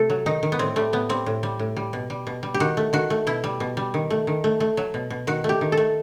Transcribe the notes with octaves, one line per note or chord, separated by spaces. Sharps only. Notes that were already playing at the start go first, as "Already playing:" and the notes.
Already playing: C3 A3 A4
F#3
D#3 D#4
D#3
B3
A2 C4
G3 A3
A2 B3
G3 C4
A2
G3
A2
G3
B2
G3
B2
G3
G4
D#3 F#4
A3
D#3 F#4
A3
B2 E4
G3
B2
G3
D#3
A3
D#3
A3
A3
F#3
B2
B2
D#3 F#4
A3
G4
D#3
A4
A3